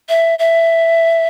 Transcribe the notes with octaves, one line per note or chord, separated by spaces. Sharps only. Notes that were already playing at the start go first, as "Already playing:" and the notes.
E5
E5